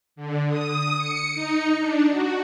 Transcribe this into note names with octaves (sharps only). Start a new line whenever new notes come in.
D3
D#6
C#7
D#4
D4
F#4